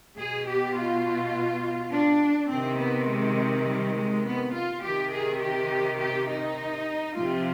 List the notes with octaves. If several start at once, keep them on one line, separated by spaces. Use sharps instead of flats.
B2 G#4
G4
F4
D4
C3 D#3 C4
B3
G#3
G3
G#3
B3
F4
C3 D#3 G4
G#4
G4
G4
D#4
C3 F3 F4